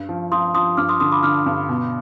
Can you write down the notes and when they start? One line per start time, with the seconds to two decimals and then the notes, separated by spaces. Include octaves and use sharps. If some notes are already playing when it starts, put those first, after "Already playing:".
Already playing: G2
0.09 F3
0.32 F3 C6 D#6
0.54 F3 C6 D#6
0.77 G2 D6 F6
0.89 C6 D#6
1.00 D3 C6 D#6
1.12 B5 D6
1.23 D3 D6 F6
1.46 G2
1.69 B2